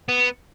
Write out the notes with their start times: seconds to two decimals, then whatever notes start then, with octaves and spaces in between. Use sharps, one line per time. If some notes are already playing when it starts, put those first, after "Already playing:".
0.09 B3